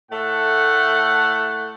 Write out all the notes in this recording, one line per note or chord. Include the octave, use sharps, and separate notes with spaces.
A2 A3 A4 F#5